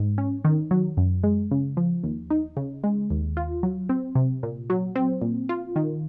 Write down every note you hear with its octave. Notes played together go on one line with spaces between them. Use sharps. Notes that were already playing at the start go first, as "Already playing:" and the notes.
Already playing: G#2
C#4
D#3
F#3
F#2
G#3
C#3
F3
D#2
D#4
C#3
G#3
D#2
F4
F#3
C4
C3
A#2
F#3
C4
A#2
F4
D#3